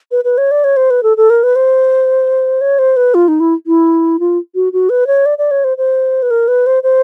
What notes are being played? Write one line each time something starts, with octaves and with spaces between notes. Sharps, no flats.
B4
B4
C#5
D5
C#5
C5
B4
A4
A4
A#4
B4
C5
C#5
C5
B4
F4
D#4
E4
E4
F4
F#4
F#4
B4
C#5
D5
D5
C#5
C5
C5
B4
A#4
B4
C5
C5